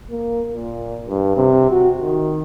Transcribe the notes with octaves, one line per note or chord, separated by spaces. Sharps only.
A#3
A#2
G2
C3
F#4
D#3